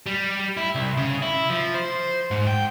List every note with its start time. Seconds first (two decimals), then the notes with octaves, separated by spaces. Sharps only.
0.06 G3
0.57 E4
0.75 C2
0.97 C#3
1.22 E4
1.50 F3
1.75 C5
2.31 G#2
2.47 G5